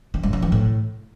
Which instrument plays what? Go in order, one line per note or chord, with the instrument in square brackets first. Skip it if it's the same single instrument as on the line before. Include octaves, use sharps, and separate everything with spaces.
[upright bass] D#3
G2
D3
E3
A2